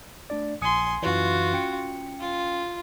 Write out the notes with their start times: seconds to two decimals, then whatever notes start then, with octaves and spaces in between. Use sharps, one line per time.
0.30 A3 D4 D5
0.61 A#1 G#5 C6 D#6 C#7
1.02 F#2 E3 F4 F#4
1.53 C#4 G5 C#7
2.19 F4